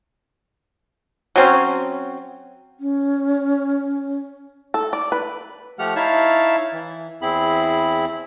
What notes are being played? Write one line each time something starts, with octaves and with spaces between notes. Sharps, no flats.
F#3 C4 C#4
C#4
A4
D5
B4
F3 A3 G4 F#5 F6
D#4 E4 C#5 E5 F5 A5
E3
E2 C4 E4 G#4 B5